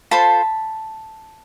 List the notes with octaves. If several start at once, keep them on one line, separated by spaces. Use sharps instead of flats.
F4 A4 C5 A5 B5